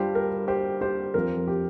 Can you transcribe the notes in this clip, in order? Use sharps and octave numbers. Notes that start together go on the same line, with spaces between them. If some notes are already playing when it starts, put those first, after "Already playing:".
Already playing: G2 G3 D4 F4 G4 C5
A#4
G4 C5
G4 C5
F2 F3 C4 F4 A#4
G4